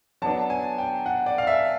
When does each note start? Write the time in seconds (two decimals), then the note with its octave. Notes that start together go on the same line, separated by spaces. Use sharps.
0.22 F#3 B3 D4 A5
0.50 G#5
0.78 G5
1.06 F#5
1.26 D5
1.38 F5
1.47 E5